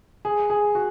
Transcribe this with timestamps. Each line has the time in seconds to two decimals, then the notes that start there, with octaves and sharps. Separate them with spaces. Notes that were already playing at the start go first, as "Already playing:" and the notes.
0.25 G#4
0.50 G#4
0.75 F#4